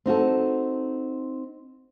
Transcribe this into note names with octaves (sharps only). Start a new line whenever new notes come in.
C4 D#4 F#4 A4